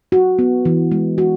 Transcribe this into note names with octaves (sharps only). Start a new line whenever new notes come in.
F#4
B3
E3
G#3
F#4